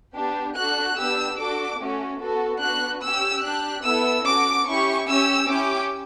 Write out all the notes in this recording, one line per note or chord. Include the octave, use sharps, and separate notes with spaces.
B3 D4 G4
D4 F#4 A4 F#6
B3 D4 G4 E6
D4 F#4 A4 D6
A3 C#4 F#4
B3 F#4 A4
B3 D4 F#4 F#6
C#4 G4 E6
D4 G4 F#6
B3 E4 A4 E6
C#4 F#4 A4 D6
C#4 E4 G4 C#6
C#4 G4 E6
C#4 E4 G4 D6